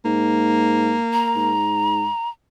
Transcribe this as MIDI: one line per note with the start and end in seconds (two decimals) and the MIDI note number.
0.05 0.96 44
0.05 1.52 58
1.13 2.29 82
1.35 2.09 44